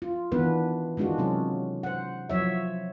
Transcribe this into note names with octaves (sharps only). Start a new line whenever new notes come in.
F4
D#3 E3 B3 D4 B4
D#3 G#3 D4 F4 F#4
C3 F#3 C#4
C5 F#5
F3 F#3 C#5 E5